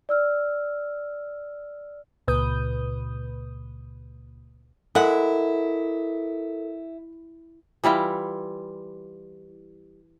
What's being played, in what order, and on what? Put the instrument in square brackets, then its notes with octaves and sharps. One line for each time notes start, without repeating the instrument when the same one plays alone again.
[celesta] D5 E6 F6
[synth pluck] C#2 A#2 B4 D#6 G6
[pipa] G#3 F#5 [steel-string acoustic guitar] E4 [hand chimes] A4 A#4
[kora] E3 G3 E4 F4